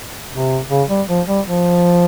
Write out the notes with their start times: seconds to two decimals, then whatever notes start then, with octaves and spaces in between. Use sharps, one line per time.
0.32 C3
0.70 C#3
0.89 G3
1.09 F3
1.27 G3
1.47 F3